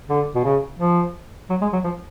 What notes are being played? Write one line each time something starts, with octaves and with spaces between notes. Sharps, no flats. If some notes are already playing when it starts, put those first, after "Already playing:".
D3
B2
C#3
F3
F#3
G#3
F#3
F3